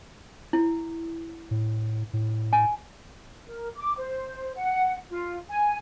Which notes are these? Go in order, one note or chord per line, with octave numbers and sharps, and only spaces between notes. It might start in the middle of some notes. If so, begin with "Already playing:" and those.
E4
A2
A2
G#5
A#4
D6
C5
F#5
F4
G#5